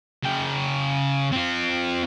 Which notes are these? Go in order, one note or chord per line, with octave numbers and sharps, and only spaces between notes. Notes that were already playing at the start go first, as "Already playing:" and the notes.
C#3 G5
C4 F4